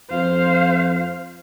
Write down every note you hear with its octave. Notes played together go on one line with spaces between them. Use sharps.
F2 C5 F5